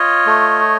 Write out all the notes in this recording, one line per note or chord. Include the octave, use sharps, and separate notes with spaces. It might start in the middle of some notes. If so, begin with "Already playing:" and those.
Already playing: F4 C#5 D#5
A3